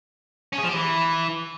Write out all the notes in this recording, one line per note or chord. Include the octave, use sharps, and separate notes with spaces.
C#4
G#4
F3
G4
E3